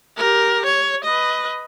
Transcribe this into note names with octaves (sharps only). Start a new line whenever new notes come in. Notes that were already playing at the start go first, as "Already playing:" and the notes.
G4 A#4
C#5
B4 D#5